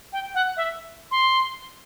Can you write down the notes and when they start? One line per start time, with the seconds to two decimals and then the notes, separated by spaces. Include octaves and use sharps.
0.13 G5
0.35 F#5
0.57 E5
1.11 C6